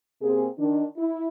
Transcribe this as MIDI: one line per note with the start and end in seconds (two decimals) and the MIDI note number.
0.21 0.46 48
0.21 0.46 58
0.21 0.46 60
0.21 0.46 68
0.59 0.84 51
0.59 0.84 62
0.97 1.27 64